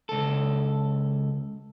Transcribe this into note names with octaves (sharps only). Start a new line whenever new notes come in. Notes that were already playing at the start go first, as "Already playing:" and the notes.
C#2 A4